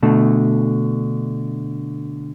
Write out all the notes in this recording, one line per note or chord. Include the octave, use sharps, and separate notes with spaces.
B2 D3 A3